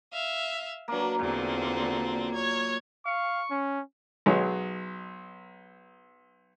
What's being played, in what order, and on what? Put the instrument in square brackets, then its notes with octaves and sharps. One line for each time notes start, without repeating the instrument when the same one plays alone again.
[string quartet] E5 F5
[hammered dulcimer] F#3 A#3 [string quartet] D4 B4
[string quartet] E2 D3 C4 [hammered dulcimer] A#2
[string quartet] C#5 G#6
[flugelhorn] F5 [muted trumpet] C#6
[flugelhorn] C#4
[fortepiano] B1 F#3 G#3 G#4 C#5